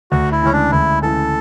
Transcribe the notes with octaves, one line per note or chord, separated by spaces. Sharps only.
D2 F#4
E4
C#3 E3 G#3 C#4
D4
D2 E4
C#3 E3 G#3 A4